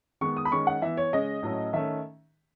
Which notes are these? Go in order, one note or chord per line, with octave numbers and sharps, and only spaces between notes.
D#3 G#3 B3 C#6
D#6
B5
D#3 G#3 C#4 C#6
F#5
E3 B3 E5
C#5
C#3 G#3 C#4 D#5
A2 F#3 A3 C#4
D#3 A3 C#4 E5